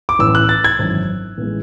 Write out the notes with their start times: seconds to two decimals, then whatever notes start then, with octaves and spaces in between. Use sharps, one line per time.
0.09 D6
0.19 A1 A2 E3 E6
0.35 F#6
0.49 A6
0.64 G#6
0.79 G#1 F#2 E3
1.38 A1 E3 G#3